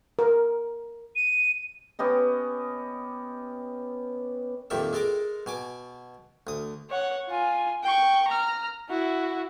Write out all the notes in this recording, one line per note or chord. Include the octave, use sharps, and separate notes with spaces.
A#4
D#7
B3 C#4 G4 D#5
F2 A#2 D#3 G3 E5
G#3 A4 A#4 D6
B2 G#5 D6
D2 D#6
C#5 F#5
F4 G#5
G5 C#6
A#5 F6
E4 F#4